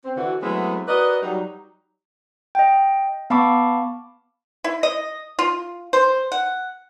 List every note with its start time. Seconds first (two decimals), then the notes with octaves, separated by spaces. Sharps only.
0.05 C4
0.16 D3 E3 F#4
0.42 F#3 G#3 A3 B3 C4 E4
0.87 F#4 A#4 B4 D5 D#5
1.22 F#3 G3 D#4
2.55 D#5 G5
3.30 B3 F5 A5 B5 C#6 D6
4.64 E4
4.83 D#5
5.39 F4
5.93 C5
6.32 F#5